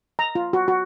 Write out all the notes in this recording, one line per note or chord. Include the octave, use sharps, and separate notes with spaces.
A#5
F4
F#4
F#4